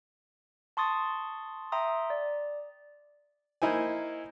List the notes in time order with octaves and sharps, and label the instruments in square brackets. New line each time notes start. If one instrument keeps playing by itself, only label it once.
[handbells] A5 C6 C#6 D#6 A6
E5 G5 A#5 C6 D#6
D5
[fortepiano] A#3 D#4 E4 C5 G#5